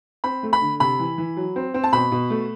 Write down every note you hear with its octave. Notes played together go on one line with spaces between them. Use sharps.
C4 B5
A3
B5
D3
C3 B5
E3
E3
F#3
C4
C4
A5
B2 B5
B2
A3